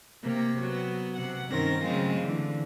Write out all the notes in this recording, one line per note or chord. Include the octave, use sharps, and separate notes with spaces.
C3 A#3 G4
F#3 B3
C3 F#5
G2 D#3 C4 C#4 A#4 A#6
C#3 F#3 G#3 A3 C4 F4
D3 E3